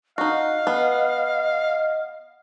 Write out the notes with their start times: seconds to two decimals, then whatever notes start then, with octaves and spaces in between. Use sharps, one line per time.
0.18 D#4 F#4 D#5 F5
0.67 B3